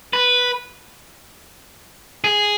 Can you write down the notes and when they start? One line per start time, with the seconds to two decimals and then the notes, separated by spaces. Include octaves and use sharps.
0.13 B4
2.24 G#4